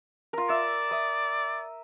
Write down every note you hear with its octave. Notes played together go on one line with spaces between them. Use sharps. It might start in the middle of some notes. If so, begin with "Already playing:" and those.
F4 A#4
D5 E5
E5 D#6